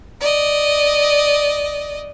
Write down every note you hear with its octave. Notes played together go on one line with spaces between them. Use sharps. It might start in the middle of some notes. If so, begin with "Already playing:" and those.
D5 D#5